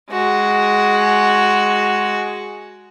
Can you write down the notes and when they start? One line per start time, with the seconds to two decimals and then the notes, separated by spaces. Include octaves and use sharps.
0.11 G#3 F#4